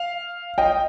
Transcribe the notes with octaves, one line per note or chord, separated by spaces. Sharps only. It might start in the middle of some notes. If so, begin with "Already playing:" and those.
Already playing: F5
D#5 G5